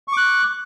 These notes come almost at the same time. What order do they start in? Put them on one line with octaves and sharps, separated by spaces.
C#6 D6 F#6